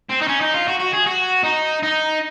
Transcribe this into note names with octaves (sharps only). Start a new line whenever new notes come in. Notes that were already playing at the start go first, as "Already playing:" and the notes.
C4
D#4
C#4
D#4
F4
F#4
F#4
G#4
F#4
D#4
D#4